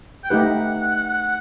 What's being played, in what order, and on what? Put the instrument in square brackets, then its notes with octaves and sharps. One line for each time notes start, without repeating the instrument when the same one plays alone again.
[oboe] G5
[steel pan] A3 D#4 G4 B4 [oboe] F#5